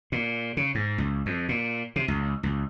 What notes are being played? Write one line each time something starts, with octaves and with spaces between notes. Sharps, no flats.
A#2
C#3
G#2
C#2
F2
A#2
C3
C#2
C#2